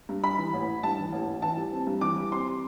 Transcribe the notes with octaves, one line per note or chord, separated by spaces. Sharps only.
G2
G2 B5
E3
A1
A1
G2 A5
E3
A1
A1
E3 A5
G3
C4
G2
E3 D6
G3
C4 C6